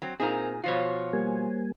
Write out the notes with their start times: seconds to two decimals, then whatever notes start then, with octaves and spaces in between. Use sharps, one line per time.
0.02 F#3 C4
0.20 A#2 C4 D#4 G#4 A#4
0.64 B2 F3 F4 F#4 C5 C#5
1.13 G3 A#3 G#5